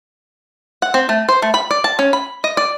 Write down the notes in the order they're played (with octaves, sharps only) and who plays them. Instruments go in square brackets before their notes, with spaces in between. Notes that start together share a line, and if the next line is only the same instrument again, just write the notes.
[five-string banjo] F#5
C4
A3
C5
A3
B5
D5
A5
C#4
B5
D#5
D5